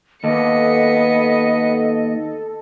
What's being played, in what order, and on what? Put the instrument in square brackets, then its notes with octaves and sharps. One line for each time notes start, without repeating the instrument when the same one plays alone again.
[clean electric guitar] D#2 [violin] B3 C#7 [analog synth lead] A4 [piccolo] D#5